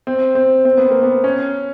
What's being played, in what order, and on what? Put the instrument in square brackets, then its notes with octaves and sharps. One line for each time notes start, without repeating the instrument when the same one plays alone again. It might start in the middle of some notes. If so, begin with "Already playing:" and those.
[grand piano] C4
C4
C4
B3
A#3
B3
C#4